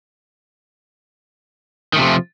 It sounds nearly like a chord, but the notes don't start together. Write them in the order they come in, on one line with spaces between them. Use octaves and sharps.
D#3 A3 C3 F3